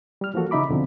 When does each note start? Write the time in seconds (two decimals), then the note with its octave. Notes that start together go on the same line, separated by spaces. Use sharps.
0.21 G3 F6
0.34 E3 F3 A#3 F#4 A4
0.51 C#3 D#4 E5 B5 D6
0.69 D#2 B2 D3 F3 C4